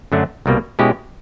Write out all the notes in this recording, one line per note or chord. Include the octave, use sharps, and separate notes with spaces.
F#2 D3 F#3 A3 D4
C2 B2 G3 A#3
B2 G#3 C#4 E4 G4